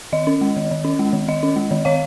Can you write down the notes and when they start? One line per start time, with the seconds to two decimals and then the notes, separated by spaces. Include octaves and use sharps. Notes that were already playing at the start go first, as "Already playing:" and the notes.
0.13 D#3 D#5
0.27 C#4
0.41 G#3
0.57 D#3
0.71 D#3
0.85 C#4
0.99 G#3
1.13 D#3
1.28 D#3 D#5
1.43 C#4
1.56 G#3
1.71 D#3
1.85 D#3 C#5 F5